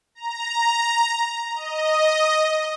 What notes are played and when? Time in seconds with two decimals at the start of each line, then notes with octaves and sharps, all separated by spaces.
0.15 A#5
1.55 D#5